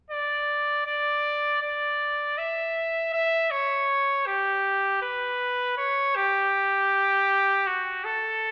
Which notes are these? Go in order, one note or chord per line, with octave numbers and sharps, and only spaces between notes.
D5
D5
D5
E5
E5
C#5
G4
B4
C#5
G4
F#4
A4